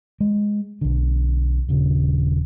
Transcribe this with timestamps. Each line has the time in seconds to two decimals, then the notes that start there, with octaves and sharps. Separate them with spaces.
0.20 G#3
0.81 B1 D3
1.69 D#1 C#3